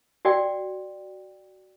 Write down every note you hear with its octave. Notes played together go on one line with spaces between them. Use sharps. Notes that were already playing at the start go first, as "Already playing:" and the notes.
F#4 D5 G5